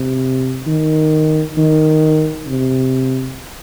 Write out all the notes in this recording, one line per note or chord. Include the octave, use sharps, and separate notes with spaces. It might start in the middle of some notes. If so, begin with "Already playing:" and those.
Already playing: C3
D#3
D#3
C3